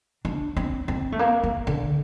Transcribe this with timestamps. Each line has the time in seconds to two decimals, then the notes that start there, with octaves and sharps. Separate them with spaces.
0.25 D4
0.57 C4
0.88 C4
1.12 A3
1.19 A#3
1.43 A#3
1.67 D3